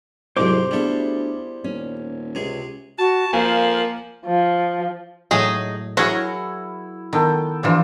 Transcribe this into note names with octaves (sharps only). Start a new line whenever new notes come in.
C2 F2 G#2 C3 F#3 G#3 C5 D6
D2 G3 B3 E4 G#4 A4
D#1 C#4
C#2 C3 G#4
F#4 A5
F3 A#3 A#4 G#5
F3
A2 F#3 G#3 A3 D#4 G#4
F#3 E4 F#4 G#4 A#4 C#5
D#3 B3 A4 G5
E3 F3 D4 F4 G4